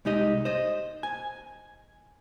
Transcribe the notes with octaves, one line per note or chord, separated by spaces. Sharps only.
C2 G#3 D#4 G4 D#5
C5 D#5
G#5